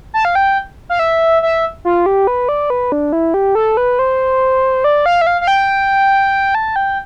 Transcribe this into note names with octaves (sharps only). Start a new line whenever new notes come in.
A5
F5
G5
F5
E5
E5
F4
G4
B4
D5
B4
D4
E4
G4
A4
B4
C5
D5
F5
E5
F5
F5
G5
A5
G5